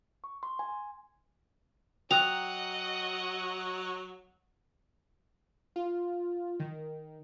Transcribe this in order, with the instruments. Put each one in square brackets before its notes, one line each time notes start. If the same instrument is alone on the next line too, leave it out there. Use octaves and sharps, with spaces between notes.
[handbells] C#6
C6
G#5
[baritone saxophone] F#3 [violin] D#5 F#5 [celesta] G5 D#6 F#6 [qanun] A#5
[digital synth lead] F4
D#3